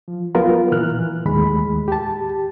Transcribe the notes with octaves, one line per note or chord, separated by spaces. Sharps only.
F3
F#3 B3 F4 A#4 B4
A#2 E3 F6 F#6
E3
D#2 A2 D#3 G#3 B5
G4 A5